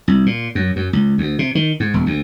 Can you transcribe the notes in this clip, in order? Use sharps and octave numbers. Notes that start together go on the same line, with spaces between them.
C2
A#2
F#2
F#2
C#2
D2
C3
D#3
G#2
E1
D2